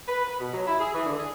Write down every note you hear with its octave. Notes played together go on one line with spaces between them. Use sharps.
B4
B4
B2
F#3
E4
G#4
E3
D3
G#4